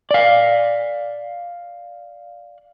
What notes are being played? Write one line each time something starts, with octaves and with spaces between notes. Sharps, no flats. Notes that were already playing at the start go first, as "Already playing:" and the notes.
D5 F5